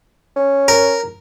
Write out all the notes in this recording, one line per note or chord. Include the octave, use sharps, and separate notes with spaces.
C#4
A#4